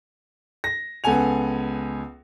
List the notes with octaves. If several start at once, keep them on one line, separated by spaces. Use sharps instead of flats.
A#6
C#2 B3 A4 F#5 G#5 F7